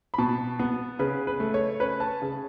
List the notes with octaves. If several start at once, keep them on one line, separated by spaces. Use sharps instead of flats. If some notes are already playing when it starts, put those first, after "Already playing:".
B5
B2 A5
B3
C#3 B4
B4
A3
C#5
C#4 B4
A5
C#3